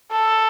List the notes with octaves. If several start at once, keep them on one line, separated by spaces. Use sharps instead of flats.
A4